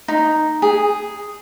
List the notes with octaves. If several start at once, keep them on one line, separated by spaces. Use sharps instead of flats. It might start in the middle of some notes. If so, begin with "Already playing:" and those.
D#4
G#4